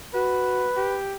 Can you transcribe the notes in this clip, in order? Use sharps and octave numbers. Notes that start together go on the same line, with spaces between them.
F#4 B4
G4